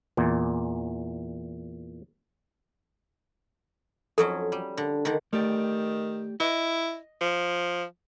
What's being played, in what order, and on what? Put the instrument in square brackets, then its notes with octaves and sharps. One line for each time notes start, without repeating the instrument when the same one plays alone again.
[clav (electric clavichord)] E2 A#2
[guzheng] F2 F#3 C#4 [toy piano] A4
[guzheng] G3
D3
D3 D#3
[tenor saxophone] D#3 [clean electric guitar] A3 G4 D5
[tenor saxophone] E4 [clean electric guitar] D#5
[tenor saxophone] F3